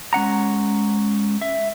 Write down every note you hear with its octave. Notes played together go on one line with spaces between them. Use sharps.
G#3 C#4 F#5 A#5
E5